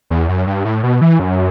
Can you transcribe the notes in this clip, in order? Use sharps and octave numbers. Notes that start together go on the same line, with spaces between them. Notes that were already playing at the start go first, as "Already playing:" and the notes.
E2
F#2
G2
A2
B2
E3
F#2